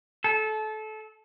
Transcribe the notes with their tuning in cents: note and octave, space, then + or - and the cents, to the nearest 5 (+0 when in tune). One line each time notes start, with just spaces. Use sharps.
A4 -25